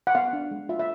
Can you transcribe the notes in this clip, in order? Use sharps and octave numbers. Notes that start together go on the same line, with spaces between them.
F#5
B3 F5
D4
G#3
F4 E5
E5